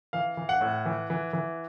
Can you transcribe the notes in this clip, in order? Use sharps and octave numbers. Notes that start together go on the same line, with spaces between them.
E3 F5
E3
F#5
A2
E3
E3
E3